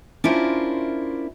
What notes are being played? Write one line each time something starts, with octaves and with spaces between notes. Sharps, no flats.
C#4 D4 E4 F4 A#4 C5